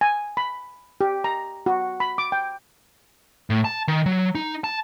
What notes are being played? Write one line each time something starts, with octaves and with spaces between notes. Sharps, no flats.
G#5
B5
G4
A#5
F#4
B5
D6
G5
A2
A5
D#3
F#3
D#4
A5